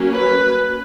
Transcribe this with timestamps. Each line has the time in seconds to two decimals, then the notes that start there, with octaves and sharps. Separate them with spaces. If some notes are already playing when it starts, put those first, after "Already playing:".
Already playing: F#3 A#3 C#4
0.10 B4